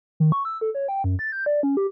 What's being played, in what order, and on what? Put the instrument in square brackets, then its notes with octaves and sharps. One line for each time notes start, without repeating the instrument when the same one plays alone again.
[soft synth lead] D#3
C#6
E6
A4
C#5
G5
F#2
A6
G6
D5
C#4
G4